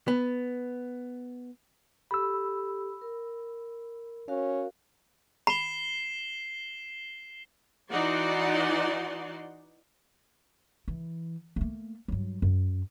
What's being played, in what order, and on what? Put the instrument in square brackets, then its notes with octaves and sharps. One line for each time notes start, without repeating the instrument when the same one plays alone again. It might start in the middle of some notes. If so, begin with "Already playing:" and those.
[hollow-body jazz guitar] B3
[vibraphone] G4 A4 [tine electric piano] B5 E6
[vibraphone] A#4
[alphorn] C#4 [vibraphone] F#4 A#4 F5
[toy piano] B5 [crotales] C7 E7 G7
[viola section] E3 D#4 F#4 D5 F#5 C6
[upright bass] E3
A3 A#3
G2 F#3
F#2